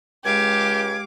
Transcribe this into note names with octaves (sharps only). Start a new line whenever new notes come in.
C#2 G#3 G4 F5 D6 G#6